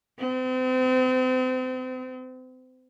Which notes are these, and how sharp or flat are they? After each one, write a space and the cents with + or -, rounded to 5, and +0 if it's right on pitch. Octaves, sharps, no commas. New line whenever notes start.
C4 -35